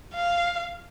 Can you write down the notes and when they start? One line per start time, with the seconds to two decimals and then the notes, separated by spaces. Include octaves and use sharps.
0.15 F5